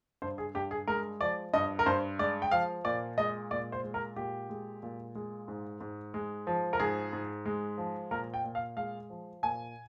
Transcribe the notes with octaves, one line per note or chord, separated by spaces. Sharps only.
G2 C5
G#4
G2 G4
G#4
G#3 A#4
F3 D5
G2 D#5
A#4
G2 C5
G#3 D5
G5
F3 F5
A#2 D5
G#3 D#5
A#2 D5
C5
G#3
A#4
A#2 G4
G#3
A#2
G#3
G#2
G#2
G#3
F3
A#4
G#2 G#4
G#2
G#3
F3
A#2 A#4
G5
A#2
F5
G#3 F5
F3
A#2 G#5